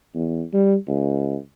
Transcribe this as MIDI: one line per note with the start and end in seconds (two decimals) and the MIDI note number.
0.14 0.44 40
0.53 0.75 55
0.88 1.36 37